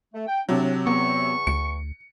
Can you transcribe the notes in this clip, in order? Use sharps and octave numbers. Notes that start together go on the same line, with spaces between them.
A3
G5
A2 C3 F#3 D4
E2 B3 C#6
D2 C#7